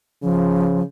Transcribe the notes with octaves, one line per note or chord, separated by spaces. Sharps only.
C#3 F3